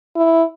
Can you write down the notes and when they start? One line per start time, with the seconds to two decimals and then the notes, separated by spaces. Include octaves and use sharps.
0.16 E4